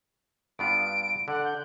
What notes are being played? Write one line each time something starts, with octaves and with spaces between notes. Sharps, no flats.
G2 B3 F4 D7
D3 F#5
G6